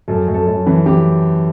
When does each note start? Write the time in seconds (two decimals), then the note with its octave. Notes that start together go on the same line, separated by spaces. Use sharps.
0.08 F#2 A4
0.28 F#2
0.34 A4
0.47 F#2
0.66 E3
0.86 E3 G4